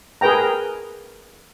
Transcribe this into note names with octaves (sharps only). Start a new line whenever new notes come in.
G#4 A#4 B4 G5 A#5